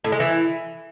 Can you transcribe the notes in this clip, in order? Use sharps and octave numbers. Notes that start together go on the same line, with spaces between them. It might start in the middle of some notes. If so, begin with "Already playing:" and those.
A2
G#3
E3